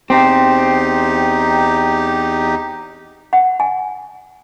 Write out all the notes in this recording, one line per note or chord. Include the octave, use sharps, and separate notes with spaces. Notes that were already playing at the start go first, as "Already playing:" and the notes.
E2 C4 D#4 G4
F#5
G#5